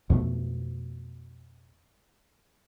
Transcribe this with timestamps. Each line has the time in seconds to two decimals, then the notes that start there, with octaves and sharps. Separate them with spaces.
0.10 F2 B2 A3